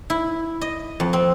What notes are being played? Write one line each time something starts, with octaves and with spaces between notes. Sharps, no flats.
E4
D#5
F2
C4